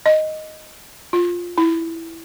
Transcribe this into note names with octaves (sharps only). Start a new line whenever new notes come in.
D#5
F4
E4